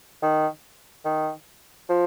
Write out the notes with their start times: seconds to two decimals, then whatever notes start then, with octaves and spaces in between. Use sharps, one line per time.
0.22 D#3
1.05 D#3
1.89 F3